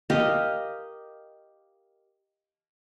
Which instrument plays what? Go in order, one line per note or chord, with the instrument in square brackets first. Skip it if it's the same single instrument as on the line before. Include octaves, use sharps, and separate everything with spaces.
[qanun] G4 A#4 D#5 F5